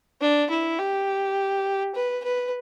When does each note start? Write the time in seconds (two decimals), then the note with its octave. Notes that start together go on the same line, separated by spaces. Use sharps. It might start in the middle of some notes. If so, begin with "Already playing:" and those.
0.20 D4
0.50 E4
0.79 G4
1.95 B4
2.24 B4